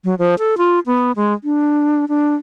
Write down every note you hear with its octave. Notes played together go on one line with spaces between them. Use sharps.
F#3
F3
A4
F4
B3
G#3
D4
D4